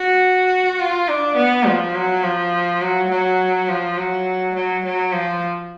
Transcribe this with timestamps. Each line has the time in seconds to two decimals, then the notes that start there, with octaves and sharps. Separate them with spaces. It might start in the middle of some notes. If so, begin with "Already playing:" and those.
Already playing: F#4
0.79 F4
1.08 D4
1.36 B3
1.66 F3
1.95 F#3
2.23 F3
2.82 F#3
3.10 F#3
3.69 F3
3.98 F#3
4.55 F#3
4.85 F#3
5.13 F3